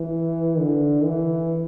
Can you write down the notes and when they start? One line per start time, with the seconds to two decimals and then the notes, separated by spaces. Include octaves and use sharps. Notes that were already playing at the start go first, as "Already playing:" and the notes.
Already playing: E3
0.59 D3
1.05 E3